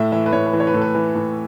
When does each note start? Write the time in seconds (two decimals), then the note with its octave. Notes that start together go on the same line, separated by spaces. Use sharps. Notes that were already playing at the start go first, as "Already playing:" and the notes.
Already playing: A2 E5
0.12 E3 E5
0.26 B4
0.32 A2 C#5
0.46 B4
0.53 E3
0.60 C#5
0.67 B4
0.74 A2 A4
0.82 B4
0.95 E3
1.15 A2